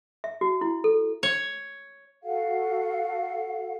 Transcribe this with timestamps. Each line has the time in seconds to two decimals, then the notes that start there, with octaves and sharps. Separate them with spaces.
0.24 E5
0.41 F#4
0.61 E4
0.84 A4
1.23 C#5
2.23 F#4 A4 F5 F#5